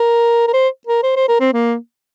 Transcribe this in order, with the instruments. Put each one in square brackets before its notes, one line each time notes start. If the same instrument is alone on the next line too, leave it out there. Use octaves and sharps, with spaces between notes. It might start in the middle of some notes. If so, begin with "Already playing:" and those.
Already playing: [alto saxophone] A#4
A#4
C5
A#4
C5
C5
A#4
C4
A#3